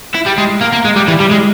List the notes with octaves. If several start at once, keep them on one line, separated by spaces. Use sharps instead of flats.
E4
G3
G#3
A#3
A#3
G#3
G3
E3
G3
G#3